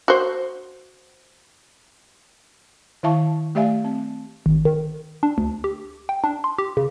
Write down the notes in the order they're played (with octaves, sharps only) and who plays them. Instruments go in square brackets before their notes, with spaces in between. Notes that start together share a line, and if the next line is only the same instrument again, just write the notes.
[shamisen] F#4 C5
[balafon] D#3 E4 E5 F5 A5 C#6
A3 G4 D5 E5 F5 G#5
C4
[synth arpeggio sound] G#1
D#3
D4
D2
G4
G5
D4
C6
G4
C#3